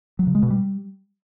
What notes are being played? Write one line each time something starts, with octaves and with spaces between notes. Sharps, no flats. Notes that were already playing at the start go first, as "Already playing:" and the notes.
F#3
C#3
G#3
B2
G3